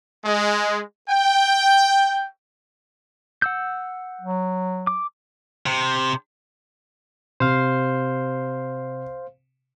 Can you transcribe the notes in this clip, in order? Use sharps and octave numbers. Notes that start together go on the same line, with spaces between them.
G#3
G5
F#5 E6 G6
F#3
D6
C3
C3 C5 F5